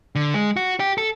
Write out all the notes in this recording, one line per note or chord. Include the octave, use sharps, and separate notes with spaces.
D3
G#3
F#4
G4
A4